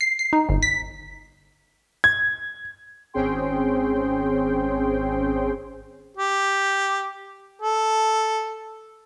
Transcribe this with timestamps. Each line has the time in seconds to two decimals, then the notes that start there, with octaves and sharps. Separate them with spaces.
0.01 C7
0.19 C7
0.33 D#4
0.49 G1
0.63 B6
2.04 G#6
3.14 G#1 C4 C#4 G#4 G5 C6
6.17 G4
7.62 A4